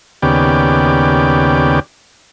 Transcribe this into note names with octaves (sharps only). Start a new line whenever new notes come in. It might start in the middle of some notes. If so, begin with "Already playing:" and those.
D#2 C#3 B3 G4 D5